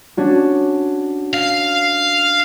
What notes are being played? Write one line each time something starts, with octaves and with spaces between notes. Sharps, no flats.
C#4 D4 F#4
F5